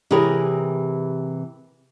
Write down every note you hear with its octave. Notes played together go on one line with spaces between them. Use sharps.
C3 E3 G4 G#4 A#4 C#5